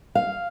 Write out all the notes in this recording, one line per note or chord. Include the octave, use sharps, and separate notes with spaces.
F5